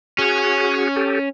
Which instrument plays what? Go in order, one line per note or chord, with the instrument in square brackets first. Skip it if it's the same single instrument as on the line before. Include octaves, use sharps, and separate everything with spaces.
[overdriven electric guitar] C#4 [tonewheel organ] F#4 G#4
[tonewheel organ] G4 A4